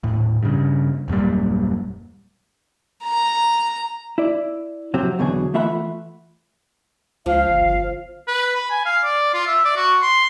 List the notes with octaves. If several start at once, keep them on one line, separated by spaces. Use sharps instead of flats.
D#1 A2
G2 C#3
D#1 F#2 A#2 G3
A#5
E4 D5
F2 C3 F#3 C4
E2 B2 D3 F#3 G#4
E3 A3 F4 E5 F#5 B5
C#2 F3 F5
G1
G1
B4
B5
G#5
F5
D5
F4
E5
D5
F#4
C6